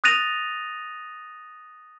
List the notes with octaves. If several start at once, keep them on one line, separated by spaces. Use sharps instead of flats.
D#6 F#6 A6 A#6 D#7 F7